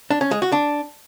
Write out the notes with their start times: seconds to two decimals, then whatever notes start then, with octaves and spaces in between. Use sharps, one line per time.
0.11 D4
0.21 C#4
0.31 G#3
0.42 F#4
0.52 D4